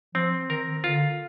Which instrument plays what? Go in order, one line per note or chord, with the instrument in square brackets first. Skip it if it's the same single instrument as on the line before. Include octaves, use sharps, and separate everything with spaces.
[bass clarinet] F3 [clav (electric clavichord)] C4
[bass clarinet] D#3 [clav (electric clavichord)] A#4
[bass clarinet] D3 [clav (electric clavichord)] F4